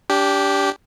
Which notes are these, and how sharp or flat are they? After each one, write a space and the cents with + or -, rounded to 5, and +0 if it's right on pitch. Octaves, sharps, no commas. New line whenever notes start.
D4 -30 G4 +0